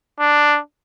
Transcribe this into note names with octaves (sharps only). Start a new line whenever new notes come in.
D4